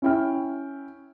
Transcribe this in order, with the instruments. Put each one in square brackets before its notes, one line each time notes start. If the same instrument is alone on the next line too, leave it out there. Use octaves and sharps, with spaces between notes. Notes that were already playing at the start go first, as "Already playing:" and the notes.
[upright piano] C#4 E4 G5 F6